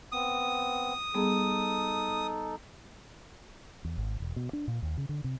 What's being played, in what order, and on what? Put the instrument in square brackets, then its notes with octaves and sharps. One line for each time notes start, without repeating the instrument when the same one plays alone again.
[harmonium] B3 C4 [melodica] D#6
[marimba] G3 B3 G#4 [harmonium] D#4 A4
[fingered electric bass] E2
G#1
E1
B2
D4
A#2
D#2
C#3
D3
C3